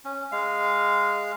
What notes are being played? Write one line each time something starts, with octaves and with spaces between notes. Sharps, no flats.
C#4
G#3 F5